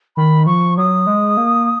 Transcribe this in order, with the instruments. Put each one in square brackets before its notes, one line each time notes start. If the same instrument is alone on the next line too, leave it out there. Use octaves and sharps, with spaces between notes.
[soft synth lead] D#3 [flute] B5
[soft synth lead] F3 [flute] C#6
[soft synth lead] F#3 [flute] D#6
[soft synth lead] G#3
A#3